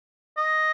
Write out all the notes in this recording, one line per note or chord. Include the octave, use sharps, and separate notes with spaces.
D#5